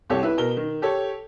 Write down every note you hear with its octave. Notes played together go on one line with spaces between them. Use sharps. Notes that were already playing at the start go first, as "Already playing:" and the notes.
C2 G4 A4 C#5
E4 B4
B2 A#4 G7
D#3
G4 A4 C#5